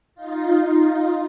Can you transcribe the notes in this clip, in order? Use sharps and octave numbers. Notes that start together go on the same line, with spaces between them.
D#4 F4